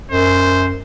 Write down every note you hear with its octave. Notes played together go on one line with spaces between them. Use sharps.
F#2 C5